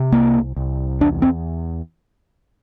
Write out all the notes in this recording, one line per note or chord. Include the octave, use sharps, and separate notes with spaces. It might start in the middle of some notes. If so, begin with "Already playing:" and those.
Already playing: C3
C2 A#3
C2
E2 D4
C4